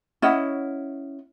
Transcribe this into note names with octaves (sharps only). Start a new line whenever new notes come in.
C#4 E4 D#5 F#5